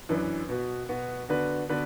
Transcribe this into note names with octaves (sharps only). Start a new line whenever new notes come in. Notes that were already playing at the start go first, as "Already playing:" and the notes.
F#2 E3 D4 B4
B2 B3 F#4
B2 B3 F#4
D3 B3 F#4 B4 D5
D3 B3 F#4 B4 D5